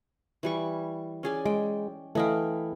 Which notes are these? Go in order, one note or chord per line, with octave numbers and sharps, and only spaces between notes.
E3 G3 C#6
C#4 G#4 D5
G#3 G5
E3 A3 E4 D#5 F5 G5